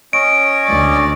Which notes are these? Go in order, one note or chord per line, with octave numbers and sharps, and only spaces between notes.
C#4 C#5 D#5 D7
D2 D5